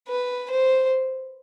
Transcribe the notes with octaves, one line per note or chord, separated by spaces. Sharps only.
B4
C5